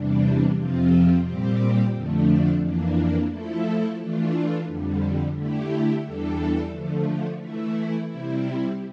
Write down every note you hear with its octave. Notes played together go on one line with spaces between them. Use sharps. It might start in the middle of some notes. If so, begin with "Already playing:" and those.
Already playing: E2 C3 E3 G3 D4
F2 C3 F3 C4 F4
A#2 G3 C4 G4
F2 D3 F3 A3 D4
F2 E3 A#3 D4
F3 A3 E4 A4
E3 A3 D4 F4
F2 D3 G3
D3 A3 E4 G4
E2 E3 G3 D4 A4
D3 F3 A3
E3 A3 E4
C3 G3 C4 E4